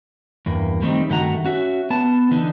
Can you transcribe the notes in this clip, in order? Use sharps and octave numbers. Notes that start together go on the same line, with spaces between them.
E2 G2 A#3
D#3 G3 A3 C4 D#4
G2 D#3 A3 F#4 F#5 A#5
C#4 F#4 E5
B3 A5
D3 E3 D4 D#4